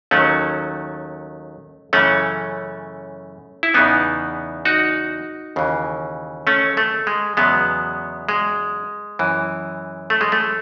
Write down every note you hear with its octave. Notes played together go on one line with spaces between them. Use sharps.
D#2 D#3 F#3 A3 C#4
F#2 C#3 E3 A3 C#4
E4
E2 C#3 E3 B3 D#4
D#4 F#4
D#2 C#3 E3
A3 C#4
A3
G#3
E2 C#3 F#3 G#3 B3
G#3
F#2 E3
A3
G#3
A3